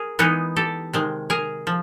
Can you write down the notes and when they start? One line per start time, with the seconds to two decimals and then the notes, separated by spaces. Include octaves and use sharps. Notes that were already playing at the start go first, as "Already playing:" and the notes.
Already playing: G#4 A#4
0.19 E3 G#3 B3 D#4
0.56 G4 A4
0.93 C3 D#3 G#3
1.30 G#4 A#4
1.67 F3